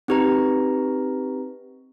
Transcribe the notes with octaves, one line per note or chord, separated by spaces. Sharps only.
C4 D#4 G4 B4 A#5